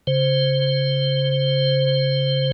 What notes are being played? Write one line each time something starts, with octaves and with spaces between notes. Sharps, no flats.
C#3 C5